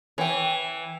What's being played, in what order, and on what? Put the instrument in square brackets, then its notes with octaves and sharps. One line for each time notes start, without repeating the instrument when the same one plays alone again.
[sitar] E3 [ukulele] C#5 G5